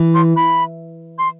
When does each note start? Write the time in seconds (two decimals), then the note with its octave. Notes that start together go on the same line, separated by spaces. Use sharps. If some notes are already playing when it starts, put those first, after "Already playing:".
Already playing: E3
0.15 C6
0.36 B5
1.18 C6